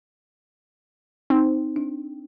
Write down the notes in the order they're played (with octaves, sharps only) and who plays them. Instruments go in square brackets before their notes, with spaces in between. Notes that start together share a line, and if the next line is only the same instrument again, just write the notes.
[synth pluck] C4 [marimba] D#4
[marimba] D4